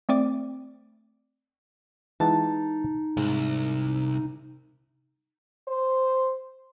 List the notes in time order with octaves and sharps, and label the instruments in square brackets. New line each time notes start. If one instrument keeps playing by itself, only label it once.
[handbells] A3 C4 D5 D6
[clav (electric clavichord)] E3 G#3 F#5 [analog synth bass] D#4 [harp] A5
[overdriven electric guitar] C2 [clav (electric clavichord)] G#2
[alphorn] C5